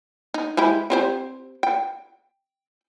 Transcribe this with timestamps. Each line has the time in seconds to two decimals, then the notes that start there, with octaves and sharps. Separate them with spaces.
0.34 D#4
0.57 G#3 E4 G4
0.90 C4 G4 C5
1.63 G5